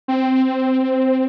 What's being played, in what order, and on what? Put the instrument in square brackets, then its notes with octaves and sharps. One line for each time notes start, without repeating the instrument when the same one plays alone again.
[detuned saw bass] C4